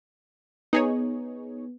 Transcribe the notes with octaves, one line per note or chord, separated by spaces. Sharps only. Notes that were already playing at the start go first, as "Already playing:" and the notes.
B3 D#4 G#4 C#5